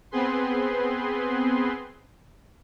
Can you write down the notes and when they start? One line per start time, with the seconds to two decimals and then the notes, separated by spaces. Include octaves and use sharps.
0.11 B3 C4 G#4 B4 C6